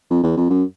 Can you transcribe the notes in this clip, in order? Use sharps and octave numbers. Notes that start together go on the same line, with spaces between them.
F2
E2
F2
F#2